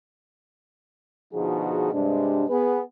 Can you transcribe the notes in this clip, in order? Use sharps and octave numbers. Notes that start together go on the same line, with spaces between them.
B2 D3 F3 D#4 F#4 G#4
G2 C3 G#3 D4
B3 G#4 B4